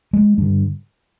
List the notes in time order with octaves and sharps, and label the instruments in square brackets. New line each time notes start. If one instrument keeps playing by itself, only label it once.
[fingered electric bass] G#3
G2 D3